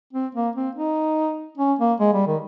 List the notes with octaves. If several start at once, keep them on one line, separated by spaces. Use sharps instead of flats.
C4
A#3
C4
D#4
C#4
A#3
G#3
G3
D#3